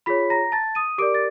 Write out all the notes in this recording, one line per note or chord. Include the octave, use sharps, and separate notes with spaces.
F4 G#4 C#5 B5 B6
A#5 A#6
A5 A6
D#6 D#7
G4 A#4 D5 D6 D7
A6